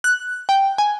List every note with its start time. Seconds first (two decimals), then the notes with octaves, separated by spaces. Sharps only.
0.04 F#6
0.49 G5
0.78 G#5